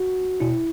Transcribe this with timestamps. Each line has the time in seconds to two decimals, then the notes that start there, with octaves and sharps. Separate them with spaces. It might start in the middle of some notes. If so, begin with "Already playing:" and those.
Already playing: F#4
0.40 B2 E4